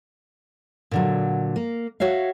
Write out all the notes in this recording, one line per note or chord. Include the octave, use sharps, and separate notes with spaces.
A#2 D3 F#3
A#3
F#4 C#5 E5 F5